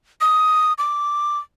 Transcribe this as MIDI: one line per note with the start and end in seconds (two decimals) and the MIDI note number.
0.21 0.73 87
0.78 1.39 86